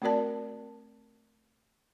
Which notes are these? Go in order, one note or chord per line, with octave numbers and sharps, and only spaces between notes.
A3 C4 F#4 A#4 D5 A5